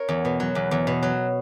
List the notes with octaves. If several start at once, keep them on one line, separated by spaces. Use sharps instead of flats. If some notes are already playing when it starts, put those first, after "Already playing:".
Already playing: A#4 C#5
E2
B2
F#3
E2
E2
B2
F#3